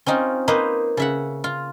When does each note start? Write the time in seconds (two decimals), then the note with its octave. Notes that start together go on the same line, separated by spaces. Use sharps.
0.06 C4 C#4 D#4 F4
0.48 A#3 D#4 B4 C5
0.97 C#3 E5 F#5
1.44 F4